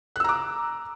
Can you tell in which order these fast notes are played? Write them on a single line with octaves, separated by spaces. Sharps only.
F#6 E6 A#5 D6